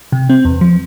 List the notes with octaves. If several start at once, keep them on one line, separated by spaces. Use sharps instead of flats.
C3
C4
E2
F3